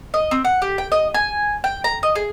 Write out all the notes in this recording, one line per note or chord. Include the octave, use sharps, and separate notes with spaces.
D#5
C4
F#5
G4
G5
D#5
G#5
G5
A#5
D#5
G#4